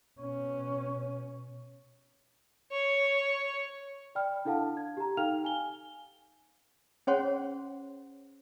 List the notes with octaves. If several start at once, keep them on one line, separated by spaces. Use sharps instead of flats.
B2 C#4
C#5
D5 G5 B5 F6
D4 E4 A4 F5 F#5 A5
G#6
G4 A#5
D#4 A4 F5 G5 F6 F7
G#5 G7
C#4 G#4 C5 C#5 F#5 C6